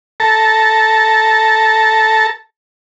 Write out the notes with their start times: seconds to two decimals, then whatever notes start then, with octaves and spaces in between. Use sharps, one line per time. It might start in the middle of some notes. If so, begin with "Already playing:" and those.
0.20 A4 A5 A#5